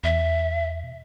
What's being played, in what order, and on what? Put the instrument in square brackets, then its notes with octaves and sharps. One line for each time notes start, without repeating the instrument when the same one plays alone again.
[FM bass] E2 [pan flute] E5
[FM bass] B2